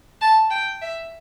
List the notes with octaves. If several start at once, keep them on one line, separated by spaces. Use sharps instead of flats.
A5
G5
E5